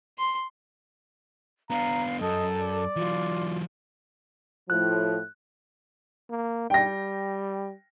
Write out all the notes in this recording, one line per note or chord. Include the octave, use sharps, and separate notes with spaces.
C6
B3 D4 F5 A#5
F#2 A4 D#5
D5
E3 F#3 F4
A2 F3 F#6
A#3
G3 G5 A#6